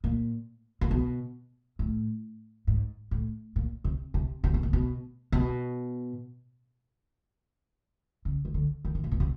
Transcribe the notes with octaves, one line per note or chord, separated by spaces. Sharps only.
A#2
A#2
B2
A2
G#2
A2
A#2
C3
C3
C3
B2
A#2
B2
B2
C#3
D#3
D3
D#3
A2
A#2
B2
C3